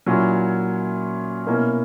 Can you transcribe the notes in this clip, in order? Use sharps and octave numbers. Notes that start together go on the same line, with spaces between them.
A#2 F#3 C#4 E4
B2 A#3 C#4 E4